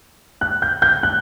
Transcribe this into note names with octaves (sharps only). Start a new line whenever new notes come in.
F#6
G6
G6
F#6